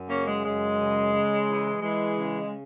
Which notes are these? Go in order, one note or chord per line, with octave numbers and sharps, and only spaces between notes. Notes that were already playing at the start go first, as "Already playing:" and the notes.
Already playing: F#2
C#3 A#3 C#4
G#3
F#2 G#3
C#3
C#3
E3
E3 G#3
C#3